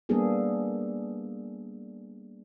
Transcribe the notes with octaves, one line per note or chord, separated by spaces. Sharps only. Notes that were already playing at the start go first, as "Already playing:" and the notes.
G3 A#3 B3 D4 G#4 A4